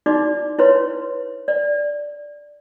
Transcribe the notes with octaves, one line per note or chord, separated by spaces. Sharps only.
D#4 E4 F#4 D5 D6
E4 B4 C#5 C6
D5